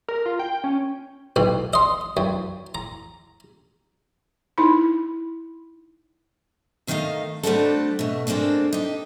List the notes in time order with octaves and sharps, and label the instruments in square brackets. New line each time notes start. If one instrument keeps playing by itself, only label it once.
[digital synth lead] A#4
F4
G5
C#4
[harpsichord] B1 B2
D#5 C6
F#2
A#5
[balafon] D#4 E4 B5
[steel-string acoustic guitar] D#2 D#3 F#3 A3 D#4 F5
G3 A3 C4 D4 F#4 A4
B2 A3
G#3 A#3 C4 D4 A4
D#4 G4